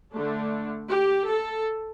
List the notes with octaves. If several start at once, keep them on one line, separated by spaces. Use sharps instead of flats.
D3 A3 D4
G4
A4